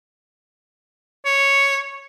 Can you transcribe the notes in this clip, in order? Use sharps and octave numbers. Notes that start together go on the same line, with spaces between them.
C#5